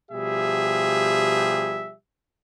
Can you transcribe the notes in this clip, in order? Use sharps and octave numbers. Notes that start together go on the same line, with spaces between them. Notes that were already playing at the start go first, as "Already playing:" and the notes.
B2 F3 G3 G4 G#4 E5